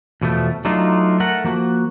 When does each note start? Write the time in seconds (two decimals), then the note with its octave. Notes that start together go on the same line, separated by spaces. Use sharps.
0.22 E2 B2 F3 A3
0.65 F#3 A3 D4 D#4 F4
1.20 A3 A#4 F#5
1.44 F3 A#3 F#4